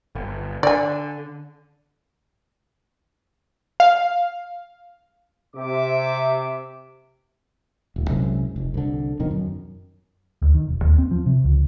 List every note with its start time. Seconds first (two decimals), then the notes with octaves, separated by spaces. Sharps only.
0.15 G1
0.63 D3 D5 G#5
3.80 F5
5.55 C3 E5 D6
7.96 D#1 D2
8.10 C2 F#2 C3 G#3
8.56 F1
8.74 C2 D3
9.20 F2 B2 D#3
9.31 F#2
10.42 D2
10.54 D#3
10.68 E1
10.85 D#2
10.98 C4
11.11 F3
11.26 C3
11.44 C#2